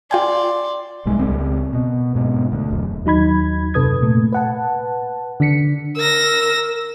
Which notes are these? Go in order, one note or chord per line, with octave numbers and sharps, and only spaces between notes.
F4 D5 G5 G#5 C6
B1 G#2 G3 G#3
C#2 C4
B2
G#2 B2
D2
E1 F#2
D#2 F#3 D#4 B5 G#6
F#2 C3 A4 B4 D#6 G#6
A#2 A3
B4 F#5 A5
D3 D4 B6 C#7
A#4 E6 A#6